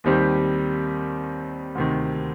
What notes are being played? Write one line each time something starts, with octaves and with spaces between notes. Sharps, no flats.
D#2 D#3 G3 C4 G4
D2 C3 D#3